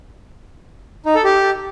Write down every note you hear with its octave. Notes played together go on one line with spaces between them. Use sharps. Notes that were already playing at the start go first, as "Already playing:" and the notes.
D#4
A4
G4